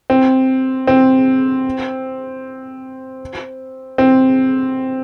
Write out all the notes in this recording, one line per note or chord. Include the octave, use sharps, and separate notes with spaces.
C4
C4
C4